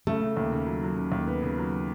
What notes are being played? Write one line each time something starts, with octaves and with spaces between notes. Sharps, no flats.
C#3 A3
C#3
D#2
C#3
F#3
F#3
C#3
D#2
B3
C#3
F#3